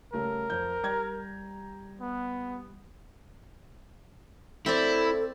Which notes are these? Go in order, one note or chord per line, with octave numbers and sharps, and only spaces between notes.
C#3 G3 A3 A#4
F2 G6
G3 A#5 G#6
B3
C4 E4 A4 D5